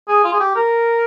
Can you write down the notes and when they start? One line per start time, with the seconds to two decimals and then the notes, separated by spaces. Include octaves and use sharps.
0.08 G#4
0.24 F4
0.33 G#4
0.40 G4
0.55 A#4